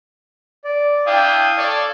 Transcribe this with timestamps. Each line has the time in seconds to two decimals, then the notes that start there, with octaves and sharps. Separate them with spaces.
0.64 D5
1.06 D4 E4 F5 G5 D#6
1.57 A4 C#5 D5